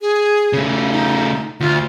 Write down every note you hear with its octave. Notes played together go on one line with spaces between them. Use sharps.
G#4
C#3 A3
D#4
D2 F4